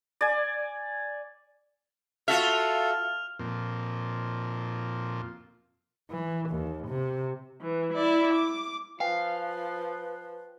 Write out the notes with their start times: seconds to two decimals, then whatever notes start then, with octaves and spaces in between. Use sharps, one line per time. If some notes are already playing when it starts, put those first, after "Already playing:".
0.21 D5 G#5
2.28 F4 F#4 A4 E5 F6 F7
3.39 F2 A#2
6.10 E3
6.50 D#2
6.87 C3
7.61 E3
7.93 E4 D5
8.34 D6
9.00 F3 B4 F5 G5 G#5 C7